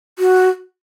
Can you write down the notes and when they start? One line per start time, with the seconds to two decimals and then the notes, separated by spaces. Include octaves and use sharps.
0.19 F#4